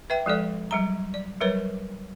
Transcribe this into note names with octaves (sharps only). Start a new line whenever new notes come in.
B4 E5 G5
F3 G#3 A4 D5
F#3 G3 A#5
D5
F#3 G3 A#4 B4 C#5